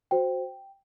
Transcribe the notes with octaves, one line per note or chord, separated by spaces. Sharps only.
F#4 C5 G5